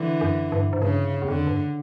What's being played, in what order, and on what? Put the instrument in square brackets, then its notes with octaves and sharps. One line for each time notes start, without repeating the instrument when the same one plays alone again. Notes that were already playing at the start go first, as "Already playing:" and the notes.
Already playing: [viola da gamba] D3 E3
[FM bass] F#2
G2
G#2
[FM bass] G2 [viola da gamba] C#3
[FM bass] E2
[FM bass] F2 [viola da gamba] D3
[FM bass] G2